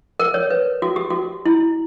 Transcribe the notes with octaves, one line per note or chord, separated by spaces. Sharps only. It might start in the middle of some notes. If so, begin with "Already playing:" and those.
A#4
C#5
B4
F#4
G4
F#4
E4